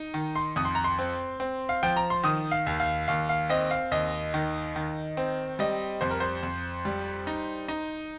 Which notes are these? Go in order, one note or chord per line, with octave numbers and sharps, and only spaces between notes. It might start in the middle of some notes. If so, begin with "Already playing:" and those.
Already playing: D#4
D#3
C6
F2 D#6
C6
A#5
C6
C4
C4
F5
F3 G5
A#5
C6
D#3 D#6
F5
D#2
F5
D#2 F5
F5
C4 D#5
F5
D#2 D#5
D#3
D#3
C4
G3 D#5
F2 C5
A#4
C5
F2
G3
D#4
D#4